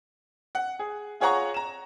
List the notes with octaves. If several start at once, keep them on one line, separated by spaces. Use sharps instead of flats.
F#5
G#4
F4 G#4 C#5 F#5 A#5 C#6
A#5 E7